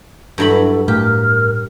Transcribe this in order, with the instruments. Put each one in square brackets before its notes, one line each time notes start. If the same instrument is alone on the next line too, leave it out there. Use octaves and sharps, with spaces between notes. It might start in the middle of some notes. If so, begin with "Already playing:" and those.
[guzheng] G2 F#3 B5 [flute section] E4 A4
[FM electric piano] A2 [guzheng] G4 [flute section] A#4 F6